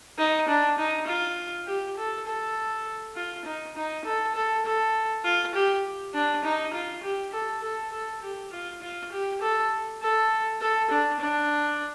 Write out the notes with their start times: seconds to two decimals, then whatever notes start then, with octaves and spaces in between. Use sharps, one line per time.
0.18 D#4
0.48 D4
0.78 D#4
1.07 F4
1.67 G4
1.97 A4
2.26 A4
3.15 F4
3.45 D#4
3.75 D#4
4.05 A4
4.35 A4
4.65 A4
5.24 F4
5.55 G4
6.14 D4
6.44 D#4
6.73 F4
7.03 G4
7.33 A4
7.63 A4
7.92 A4
8.22 G4
8.52 F4
8.82 F4
9.12 G4
9.41 A4
10.01 A4
10.61 A4
10.90 D4
11.20 D4